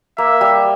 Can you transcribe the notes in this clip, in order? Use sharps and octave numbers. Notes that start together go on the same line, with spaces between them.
A#3 E5
G3